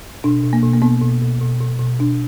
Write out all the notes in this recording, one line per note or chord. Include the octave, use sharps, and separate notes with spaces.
B2 D4
B2
A#3
B2
A#3
B2 B3
B2
B2
B2
B2
B2
B2 D4